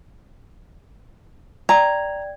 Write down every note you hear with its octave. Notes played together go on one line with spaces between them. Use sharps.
D5 G5 A#5 G#6